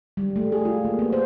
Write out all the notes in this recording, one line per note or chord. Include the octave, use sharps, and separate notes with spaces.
G3
A3
G#4
F4
A#3
B3
C5